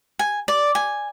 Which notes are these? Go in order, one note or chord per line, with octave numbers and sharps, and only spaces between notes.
G#5
D5
G#5